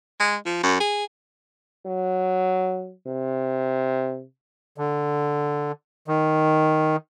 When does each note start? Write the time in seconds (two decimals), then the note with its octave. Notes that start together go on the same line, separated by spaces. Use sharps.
0.20 G#3
0.45 F3
0.63 F#2
0.80 G#4
1.86 F#3
3.07 C3
4.78 D3
6.08 D#3